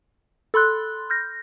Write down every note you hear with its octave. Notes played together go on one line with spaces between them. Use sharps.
A4 B5 C6 F#6
F6 G6 A#6